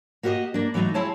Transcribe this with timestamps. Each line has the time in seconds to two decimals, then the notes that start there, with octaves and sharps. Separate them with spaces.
0.23 A#3 F#4 G4 C#5 D#5
0.54 A#3 D4
0.74 E3 F#3 A3 D#4 A4
0.94 C4 E4 G#4 C#5 A5